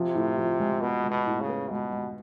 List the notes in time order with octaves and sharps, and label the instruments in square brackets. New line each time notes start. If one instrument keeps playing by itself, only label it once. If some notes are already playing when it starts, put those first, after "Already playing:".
Already playing: [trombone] C3 [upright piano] F3
[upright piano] A2
F3
G#3
[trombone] B2 [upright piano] B3
[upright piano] G#3
[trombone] B2
[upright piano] A2
[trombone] C#3
[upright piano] B3
[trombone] B2 [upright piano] G#3
[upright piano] G#3